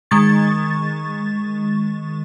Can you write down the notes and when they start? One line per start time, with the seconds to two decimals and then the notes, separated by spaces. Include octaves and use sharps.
0.11 D#3 G#3 C#6 A6